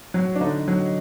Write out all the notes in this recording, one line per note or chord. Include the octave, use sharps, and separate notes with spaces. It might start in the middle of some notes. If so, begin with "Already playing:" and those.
F#3
D4
D3 D#4
F#3